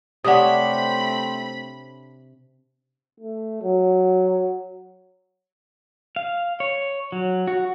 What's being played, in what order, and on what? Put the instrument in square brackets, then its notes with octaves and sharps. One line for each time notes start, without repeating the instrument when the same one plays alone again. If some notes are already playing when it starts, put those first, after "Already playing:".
[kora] C3 D4 C#5 [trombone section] A3 C4 [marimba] F#5 D#6 [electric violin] B5
[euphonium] A3
F#3
[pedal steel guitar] F5
C#5
F#3
F#4